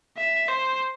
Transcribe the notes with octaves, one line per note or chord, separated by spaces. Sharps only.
E5
C5